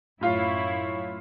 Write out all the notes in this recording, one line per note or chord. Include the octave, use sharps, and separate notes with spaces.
F#2 A2 E4 F4 C#5 F5